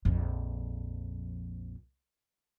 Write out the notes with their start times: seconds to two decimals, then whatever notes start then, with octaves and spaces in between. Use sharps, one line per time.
0.05 A#1 F2